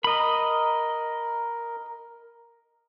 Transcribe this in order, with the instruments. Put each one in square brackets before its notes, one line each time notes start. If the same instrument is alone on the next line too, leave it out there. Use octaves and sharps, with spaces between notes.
[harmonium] A#4 [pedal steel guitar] D#5 B5